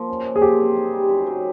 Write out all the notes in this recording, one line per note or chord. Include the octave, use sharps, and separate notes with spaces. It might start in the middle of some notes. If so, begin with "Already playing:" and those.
Already playing: F3 A#3
C#4
A#2
G#4
F3 G4
C4
D#4
G3
F#2
F#3